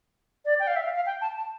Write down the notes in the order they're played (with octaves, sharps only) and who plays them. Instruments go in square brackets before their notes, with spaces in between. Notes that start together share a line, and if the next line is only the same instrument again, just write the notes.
[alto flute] D5
G5
F5
E5
F5
F5
G5
A5
A5